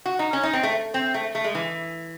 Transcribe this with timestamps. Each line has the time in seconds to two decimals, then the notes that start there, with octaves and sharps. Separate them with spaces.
0.06 F#4
0.19 D#4
0.33 C#4
0.43 D#4
0.53 C4
0.63 A3
0.94 C4
1.14 A3
1.35 A3
1.44 G#3
1.55 E3